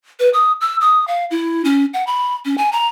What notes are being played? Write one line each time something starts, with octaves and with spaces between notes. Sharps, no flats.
B4
D#6
E6
D#6
F5
E4
C#4
F#5
B5
C#4
G#5
A#5